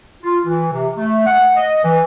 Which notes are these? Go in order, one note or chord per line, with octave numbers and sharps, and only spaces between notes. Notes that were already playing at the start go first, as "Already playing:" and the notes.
F4
E3
C3
A3
F#5
D#5
E3